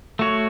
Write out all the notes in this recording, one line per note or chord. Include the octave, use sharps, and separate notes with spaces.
A3 F#4 C#5